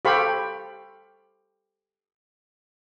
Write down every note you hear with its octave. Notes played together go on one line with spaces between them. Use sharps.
G4 A4 C5 F5 B5 C#6